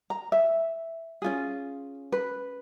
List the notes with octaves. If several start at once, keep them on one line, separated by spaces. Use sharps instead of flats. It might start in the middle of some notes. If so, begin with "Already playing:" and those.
A#5
E5
C#4 F4 G#4
B4